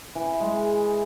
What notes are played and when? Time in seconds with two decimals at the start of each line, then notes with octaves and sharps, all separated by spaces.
0.15 E3
0.40 G#3